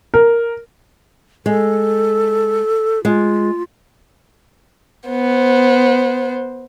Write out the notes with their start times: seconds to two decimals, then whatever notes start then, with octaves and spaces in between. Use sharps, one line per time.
0.14 A#4
1.46 G#3 A4
3.05 G#3 F4
5.09 B3 C5